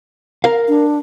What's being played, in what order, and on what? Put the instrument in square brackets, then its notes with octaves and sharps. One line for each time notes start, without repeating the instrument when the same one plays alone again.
[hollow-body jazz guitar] A#4 F5
[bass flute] D4